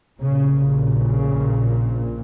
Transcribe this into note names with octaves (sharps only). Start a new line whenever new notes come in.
A#1 A#2 C#3
C#3